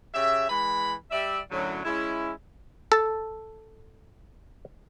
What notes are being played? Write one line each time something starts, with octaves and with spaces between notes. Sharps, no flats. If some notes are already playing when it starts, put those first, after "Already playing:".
C#3 G4 E5
E3 G#3 B5
G3 D5 E5
F#2 A2 D3 F#3
G#3 C#4 E4
A4 A5